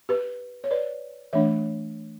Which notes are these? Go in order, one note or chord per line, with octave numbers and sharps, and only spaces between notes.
G4 B4
C#5
B4 D5
E3 A3 D4 C#5 E5